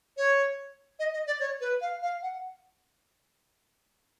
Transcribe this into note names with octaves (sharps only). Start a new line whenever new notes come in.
C#5
D#5
D#5
D5
C#5
B4
F5
F5
F#5